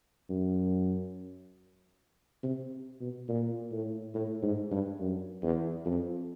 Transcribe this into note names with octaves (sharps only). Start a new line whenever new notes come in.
F#2
C3
B2
A#2
A2
A2
G#2
G2
F#2
E2
F2